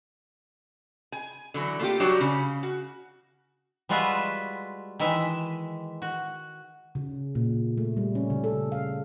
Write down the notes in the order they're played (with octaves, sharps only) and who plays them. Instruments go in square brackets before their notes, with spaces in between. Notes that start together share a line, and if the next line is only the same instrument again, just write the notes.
[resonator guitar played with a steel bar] G#5
D3 E3 F#3
A3 A#3 F4 G4
F#3 G3 D4 F#4 G4 C#5
C#3
F#4
[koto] G3 G#3 F4 F#4 B4 E5
D#3 E3 G#3 E5
F#4
[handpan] C#3
A#2
A3
G3
C#4
C#3
A4
F5